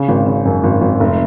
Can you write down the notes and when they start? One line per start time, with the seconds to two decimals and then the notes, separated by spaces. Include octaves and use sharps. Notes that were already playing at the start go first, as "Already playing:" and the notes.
Already playing: C#3
0.08 G#1
0.27 C#3
0.45 F#2
0.64 G#1
0.81 G#1
1.00 F1